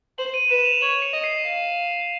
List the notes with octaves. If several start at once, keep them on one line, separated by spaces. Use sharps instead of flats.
C5 F#7
D#7
B4 E7
F7
C#5 F#7
C#7
D#5
C7
F5